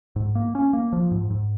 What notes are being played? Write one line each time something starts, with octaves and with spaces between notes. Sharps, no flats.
G#2
A#3
C#4
A#3
F3
G#2
G#2